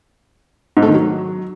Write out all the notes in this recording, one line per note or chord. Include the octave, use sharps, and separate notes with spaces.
G#2
A3
D#3
F#3